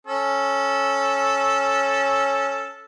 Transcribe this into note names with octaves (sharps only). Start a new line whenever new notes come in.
C#4 A4